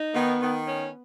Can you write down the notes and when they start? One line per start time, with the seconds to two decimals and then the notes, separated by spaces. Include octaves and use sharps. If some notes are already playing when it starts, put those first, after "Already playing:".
Already playing: D#4
0.14 D#3 B3
0.40 D#3
0.66 C#4